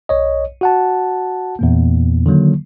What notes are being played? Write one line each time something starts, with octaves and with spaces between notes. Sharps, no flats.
B1 C#5 D#5
F#4 F#5 A5
E2 A#2 A#3
D3 D#3 F#3 A#3